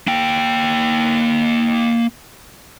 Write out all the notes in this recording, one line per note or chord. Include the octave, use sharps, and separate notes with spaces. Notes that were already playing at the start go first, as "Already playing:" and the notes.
A#3 G5